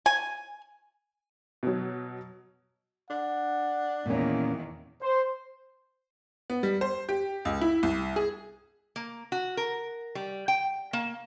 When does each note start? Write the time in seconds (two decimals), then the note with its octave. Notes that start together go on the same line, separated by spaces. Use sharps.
0.06 G#5
1.63 B2 F#3
3.10 D4 F#5
4.06 E2 A#2 D#3 A#3 C#4
5.02 C5
6.50 B3
6.63 G3
6.81 C5
7.09 G4
7.45 C#2
7.61 E4
7.83 C2
8.16 G#4
8.96 A#3
9.32 F#4
9.57 A#4
10.15 G3
10.48 G5
10.93 A#3